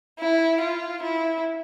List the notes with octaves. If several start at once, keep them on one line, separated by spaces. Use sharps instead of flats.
E4
F4
E4